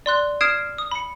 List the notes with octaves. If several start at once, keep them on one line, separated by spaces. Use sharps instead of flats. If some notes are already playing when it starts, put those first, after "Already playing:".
D5 C6 F#6
D#6 F6 G#6 C7 D7 E7
D#6
B5 C#7